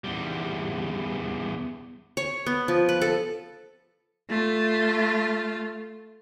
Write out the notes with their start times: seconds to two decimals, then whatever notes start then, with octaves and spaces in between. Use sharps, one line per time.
0.04 E2 G3
2.17 C#5
2.46 B3
2.68 F3
2.89 B4
3.02 A4
4.28 A3 F4